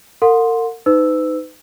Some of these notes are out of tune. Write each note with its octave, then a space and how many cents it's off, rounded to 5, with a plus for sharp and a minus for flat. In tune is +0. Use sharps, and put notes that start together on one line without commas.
A#4 -40 F#5 -35 C6 +0
D#4 +0 B4 +40 E6 +0